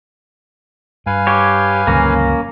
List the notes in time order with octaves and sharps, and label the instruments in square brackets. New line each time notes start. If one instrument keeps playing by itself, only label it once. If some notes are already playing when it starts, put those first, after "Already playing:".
[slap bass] G2 [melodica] B4 F5 G#5
[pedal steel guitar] G4 C#5
[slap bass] G1 C#2 F#3 [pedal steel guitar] A#3 C#4